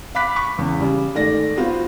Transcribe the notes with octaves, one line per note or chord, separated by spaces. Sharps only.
F5 B5 D6 F#6 B6
C#6
E2 C#3
C#3 G3
G#2 D#3 A3 D5 A#6
B3 C4 F4 F#4